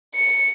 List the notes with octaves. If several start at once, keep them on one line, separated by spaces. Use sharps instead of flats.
C#7